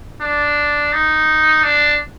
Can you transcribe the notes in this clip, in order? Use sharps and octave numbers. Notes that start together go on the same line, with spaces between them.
D4
D#4
D4